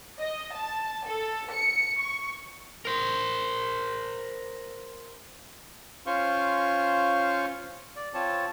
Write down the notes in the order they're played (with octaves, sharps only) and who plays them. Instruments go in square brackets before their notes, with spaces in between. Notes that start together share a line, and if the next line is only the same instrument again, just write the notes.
[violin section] D#5
A5
A4
C#7
C#6
[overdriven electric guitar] A#4 C5
[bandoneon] C#4 F4 C5 F5 C#6
D5
C4 F4 C#5 A5